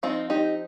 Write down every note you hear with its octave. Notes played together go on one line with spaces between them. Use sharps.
F3 C4 D#4 F4
D#4 G4